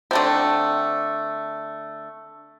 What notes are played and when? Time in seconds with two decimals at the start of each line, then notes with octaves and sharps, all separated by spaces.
0.11 D3 A3 C4